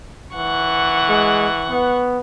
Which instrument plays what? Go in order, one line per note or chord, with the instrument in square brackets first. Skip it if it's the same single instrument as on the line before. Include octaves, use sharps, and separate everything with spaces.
[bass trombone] E3 [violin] F#5 C#6
[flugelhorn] G#3
B3